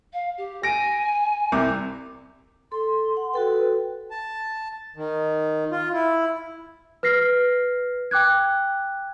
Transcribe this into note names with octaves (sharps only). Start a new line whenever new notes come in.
F5
G4
G#5 A#6 D7
C2 C3 D6
A4 C6
F#5
F#4 A4 B4 G5
A5
D#3
F4
E4
B4 F6 A#6 C7
G5 D6 F#6 G#6